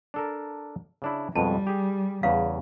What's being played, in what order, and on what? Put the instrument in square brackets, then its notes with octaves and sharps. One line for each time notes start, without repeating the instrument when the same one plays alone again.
[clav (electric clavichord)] D4 A4 A#4
C#3 D4 E4
[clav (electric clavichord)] F2 B2 G#3 [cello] G3 [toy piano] A5
[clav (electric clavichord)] G4 G#4
[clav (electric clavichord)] E2 C#3 [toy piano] F5